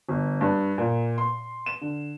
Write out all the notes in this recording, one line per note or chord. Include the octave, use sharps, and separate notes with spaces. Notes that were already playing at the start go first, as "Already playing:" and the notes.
G1
G2
A#2
C6
E7
D3